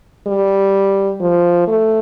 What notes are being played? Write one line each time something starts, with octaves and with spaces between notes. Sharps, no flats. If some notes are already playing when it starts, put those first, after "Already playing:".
G3
F3
A3